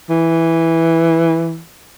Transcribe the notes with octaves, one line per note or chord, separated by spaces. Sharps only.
E3